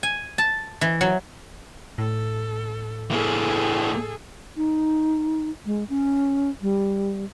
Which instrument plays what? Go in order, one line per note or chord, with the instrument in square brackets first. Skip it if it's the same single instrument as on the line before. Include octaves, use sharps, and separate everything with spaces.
[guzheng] G#5
A5
E3
F#3
[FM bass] A2 [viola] A4
[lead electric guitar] E3 A#3 [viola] G#4 A4
[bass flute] D#4
G#3
C#4
G3